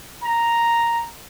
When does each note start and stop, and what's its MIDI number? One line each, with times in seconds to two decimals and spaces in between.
0.23 1.03 82